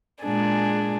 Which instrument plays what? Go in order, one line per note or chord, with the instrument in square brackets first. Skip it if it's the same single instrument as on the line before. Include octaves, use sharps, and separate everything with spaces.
[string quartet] A#2 G#3 D4 G#4